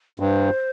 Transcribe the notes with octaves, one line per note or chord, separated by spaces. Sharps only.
G2 C5